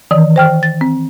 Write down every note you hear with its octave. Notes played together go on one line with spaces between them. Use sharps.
D#3 E3
C5 G5 F6
A6
C4